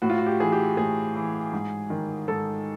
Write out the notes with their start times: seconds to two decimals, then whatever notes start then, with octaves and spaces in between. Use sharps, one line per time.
0.02 A2 F#4
0.10 F4
0.18 F#4
0.26 G4
0.40 E3 G#4
0.52 G4
0.77 A2 G#4
1.15 E3
1.53 G#2
1.90 D#3
2.28 G#2 A4